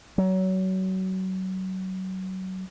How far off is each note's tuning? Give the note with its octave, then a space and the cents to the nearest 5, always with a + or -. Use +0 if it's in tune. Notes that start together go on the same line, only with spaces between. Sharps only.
F#3 +25